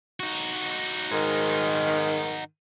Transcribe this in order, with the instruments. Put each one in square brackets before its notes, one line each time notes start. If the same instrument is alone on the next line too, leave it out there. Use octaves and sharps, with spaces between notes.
[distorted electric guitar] D#4 F#4
[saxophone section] G#2 D#3